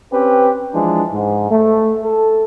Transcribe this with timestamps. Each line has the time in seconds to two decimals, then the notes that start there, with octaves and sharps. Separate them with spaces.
0.13 C4 C#4 G4 B4
0.74 E3 F3 G#3 D4
1.13 G#2
1.51 A3
2.04 A4